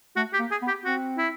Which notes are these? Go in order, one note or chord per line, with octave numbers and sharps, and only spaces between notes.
A3 F#4
G4
A#3
G#4
B3
G4
C4 F#4
E4